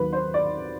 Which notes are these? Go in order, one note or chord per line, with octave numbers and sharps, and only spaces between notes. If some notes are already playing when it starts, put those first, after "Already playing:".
Already playing: D#2 D#3 F#3 A#3 B4
C5
D5